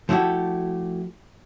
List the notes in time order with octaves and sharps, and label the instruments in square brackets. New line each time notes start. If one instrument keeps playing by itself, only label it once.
[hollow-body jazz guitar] F3 A3 E4 F#4 G4